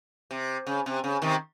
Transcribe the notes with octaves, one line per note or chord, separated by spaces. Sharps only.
C3
C#3
C3
C#3
C3 D#3